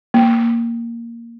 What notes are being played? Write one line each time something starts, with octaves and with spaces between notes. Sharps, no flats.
A#3